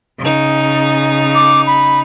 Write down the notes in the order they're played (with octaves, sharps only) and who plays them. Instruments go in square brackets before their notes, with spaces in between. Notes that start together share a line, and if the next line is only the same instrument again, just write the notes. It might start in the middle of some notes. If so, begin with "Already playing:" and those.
[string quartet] C#3 D#4
[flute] D6
B5